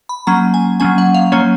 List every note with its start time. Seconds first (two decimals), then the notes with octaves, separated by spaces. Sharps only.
0.09 B5
0.27 F#3 A#3 C#4 A#5
0.54 G#5
0.80 F#3 A#3 C#4 G#5
0.98 F#5
1.14 F5
1.32 F#3 A#3 C#4 C#5